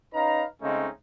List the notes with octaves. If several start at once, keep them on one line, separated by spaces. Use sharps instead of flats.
C#4 D#4 B4 F5 A#5
C#3 G#3 A3 C4 C#4 D#4